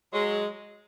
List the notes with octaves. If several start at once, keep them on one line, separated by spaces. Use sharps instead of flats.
F#3 G#3